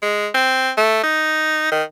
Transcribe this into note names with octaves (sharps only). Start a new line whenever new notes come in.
G#3
C4
A3
D#4
D#3